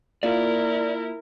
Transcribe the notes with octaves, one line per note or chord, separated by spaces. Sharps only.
A#3 E4 F4 A#4 D5